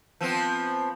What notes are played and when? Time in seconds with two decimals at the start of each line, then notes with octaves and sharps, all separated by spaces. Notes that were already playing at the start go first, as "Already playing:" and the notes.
0.21 F3 B3 C4